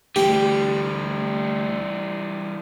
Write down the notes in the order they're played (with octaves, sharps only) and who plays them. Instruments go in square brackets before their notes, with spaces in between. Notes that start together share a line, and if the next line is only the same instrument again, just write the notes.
[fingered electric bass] D2 A3 [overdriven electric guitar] E3 G3 [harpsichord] G4